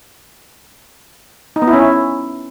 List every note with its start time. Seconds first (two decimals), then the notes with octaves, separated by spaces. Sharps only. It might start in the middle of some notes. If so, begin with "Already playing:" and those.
1.56 D#4
1.62 B3
1.68 E4
1.73 C#4
1.79 E4